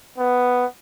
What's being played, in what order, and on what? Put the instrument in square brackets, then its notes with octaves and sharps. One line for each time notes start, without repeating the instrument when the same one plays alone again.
[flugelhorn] B3